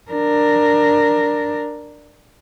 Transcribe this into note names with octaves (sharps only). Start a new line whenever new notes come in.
D4 A#4